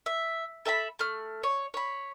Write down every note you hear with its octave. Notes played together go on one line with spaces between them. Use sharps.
E5
A4 E5 A5 B5
A3 F6
C#5
C#5 B5